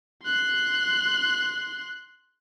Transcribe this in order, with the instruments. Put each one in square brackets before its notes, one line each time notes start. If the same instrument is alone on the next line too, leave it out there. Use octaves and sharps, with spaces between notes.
[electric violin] C6 F#6